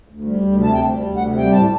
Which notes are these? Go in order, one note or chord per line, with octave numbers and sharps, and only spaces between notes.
D2
G3
D2
C3
A5
D2 G5
G3
D2
F#5
C3
G3 G5
A2 A5